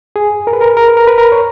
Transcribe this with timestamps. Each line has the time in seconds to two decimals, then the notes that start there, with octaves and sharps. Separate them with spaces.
0.16 G#4
0.47 A#4
0.53 B4
0.61 A#4
0.77 A#4
0.88 B4
0.97 A#4
1.07 B4
1.18 A#4
1.32 C#5